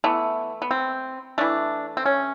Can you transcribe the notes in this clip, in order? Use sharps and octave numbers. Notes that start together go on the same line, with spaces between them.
E3 A3 B3
B3
C4
E3 A3 D4
C4
C#4